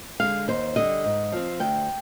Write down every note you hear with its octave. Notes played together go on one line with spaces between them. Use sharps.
D3 G#3 F5
D#2 C5
D3 G3 D#5
G#2
F3 C4
D2 G5